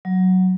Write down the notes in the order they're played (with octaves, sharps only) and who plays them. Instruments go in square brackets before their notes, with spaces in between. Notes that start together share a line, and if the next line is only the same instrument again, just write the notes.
[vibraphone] F#3